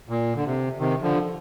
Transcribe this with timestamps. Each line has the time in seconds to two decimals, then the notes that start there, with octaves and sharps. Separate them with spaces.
0.09 A#2
0.35 D3
0.45 C3
0.79 C3 D#3
1.02 D3 F3